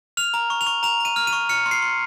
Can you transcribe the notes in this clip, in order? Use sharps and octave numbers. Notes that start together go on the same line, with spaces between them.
F6 F7
A#5
C#6
F7
C#6
A#5 F7
A#5 D#7
F6
D#7
C#6
F6 C#7
C6
C7
C6